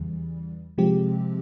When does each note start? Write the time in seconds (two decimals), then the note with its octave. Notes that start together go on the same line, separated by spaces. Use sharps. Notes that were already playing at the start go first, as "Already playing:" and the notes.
Already playing: E2 C#3 E3 G3
0.78 C3 F3 G#3 C4 G4